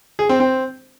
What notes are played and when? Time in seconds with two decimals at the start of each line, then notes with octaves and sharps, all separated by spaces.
0.19 G#4
0.29 C4
0.40 C4